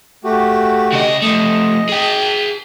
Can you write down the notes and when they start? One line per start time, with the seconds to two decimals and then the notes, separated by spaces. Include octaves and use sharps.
0.24 A3 F#4 G4
0.93 C#3 D#5
1.22 F3 A3 D#5
1.89 G#4 G5